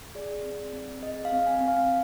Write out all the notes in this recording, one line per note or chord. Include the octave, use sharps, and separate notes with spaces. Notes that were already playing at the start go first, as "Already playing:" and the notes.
G#4 D5
C4
C4
G#4 D#5
F5
C4
G#5
C4
F5